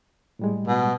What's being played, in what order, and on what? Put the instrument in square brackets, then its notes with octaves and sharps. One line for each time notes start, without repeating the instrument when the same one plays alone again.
[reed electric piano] A2 G3 G#3
[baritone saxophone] B2